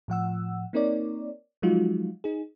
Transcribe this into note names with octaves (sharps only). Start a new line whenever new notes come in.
A2 F3 F#5 E6
A#3 C4 D#4 A#4 C#5 D5
F3 F#3 G#3 D#4 F4 F#4
D#4 G#4